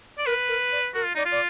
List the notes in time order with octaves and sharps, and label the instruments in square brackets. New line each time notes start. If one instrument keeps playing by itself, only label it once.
[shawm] D5
[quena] A#4 [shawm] B4
[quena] A#4
D5
[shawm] F#4 [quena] A#4
[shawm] F4
[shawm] D#4 [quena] D5
[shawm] F4
[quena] D5